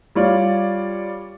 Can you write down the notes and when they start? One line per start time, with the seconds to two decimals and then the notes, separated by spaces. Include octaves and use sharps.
0.15 G3 F4 C#5 D5